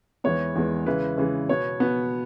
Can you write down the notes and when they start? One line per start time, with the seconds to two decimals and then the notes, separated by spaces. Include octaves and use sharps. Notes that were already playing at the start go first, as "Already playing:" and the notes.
0.24 E2 E3 G#3 B3 C#5
0.55 E2 E3 G#3 B3
0.86 C#3 E3 G#3 B4
1.18 C#3 E3 G#3
1.49 B2 B3 C#5
1.80 B2 B3